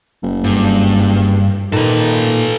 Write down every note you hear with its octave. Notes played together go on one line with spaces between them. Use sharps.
F#1
G2
A#2 D#3 A4 B4